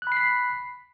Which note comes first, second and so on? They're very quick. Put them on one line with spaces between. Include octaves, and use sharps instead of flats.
F#6 B5 C7 B6